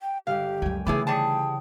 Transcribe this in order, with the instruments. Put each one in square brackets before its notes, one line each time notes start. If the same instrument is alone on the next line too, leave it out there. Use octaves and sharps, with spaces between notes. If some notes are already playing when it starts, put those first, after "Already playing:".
[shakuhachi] G5
[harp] G1 D3 [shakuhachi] G4 [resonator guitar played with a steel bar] F5
[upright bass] C#2 F#2 [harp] G5 G#5
[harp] C#3 E3 [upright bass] A3 D#4 [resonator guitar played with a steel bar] B3 E4 G#4 [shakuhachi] D6
[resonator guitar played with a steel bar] G3 G#4 A5 [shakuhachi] G5